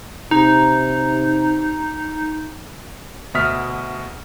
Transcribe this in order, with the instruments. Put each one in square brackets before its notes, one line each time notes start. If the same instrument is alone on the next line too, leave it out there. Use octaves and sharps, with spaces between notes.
[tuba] C3 [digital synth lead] D#4
[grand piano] D2 B2 E5 D#6 F6 B6